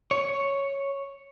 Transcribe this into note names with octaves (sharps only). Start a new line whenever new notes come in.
C#5